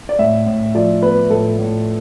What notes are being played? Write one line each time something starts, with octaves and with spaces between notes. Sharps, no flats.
D5
A2 E5
A2
F3 D5
B3 B4
A2 A4
A2